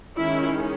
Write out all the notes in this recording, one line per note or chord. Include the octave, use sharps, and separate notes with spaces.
D#3 G#3 C#4 E4